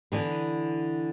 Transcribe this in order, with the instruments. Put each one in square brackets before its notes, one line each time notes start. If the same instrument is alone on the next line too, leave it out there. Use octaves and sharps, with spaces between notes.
[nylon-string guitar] D3 E3 B3